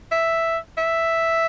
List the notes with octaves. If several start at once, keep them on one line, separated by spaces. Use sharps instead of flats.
E5
E5